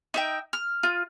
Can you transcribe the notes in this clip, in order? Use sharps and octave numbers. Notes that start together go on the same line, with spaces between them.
D#4 E5 G5
F6
F4